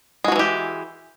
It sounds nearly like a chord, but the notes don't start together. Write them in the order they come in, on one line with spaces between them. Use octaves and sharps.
G#3 F#4 F3 E3 G4